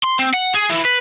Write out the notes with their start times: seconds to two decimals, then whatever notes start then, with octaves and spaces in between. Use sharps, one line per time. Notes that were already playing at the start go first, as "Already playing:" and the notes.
0.03 C6
0.19 C4
0.34 F#5
0.55 G#4
0.70 E3
0.85 B4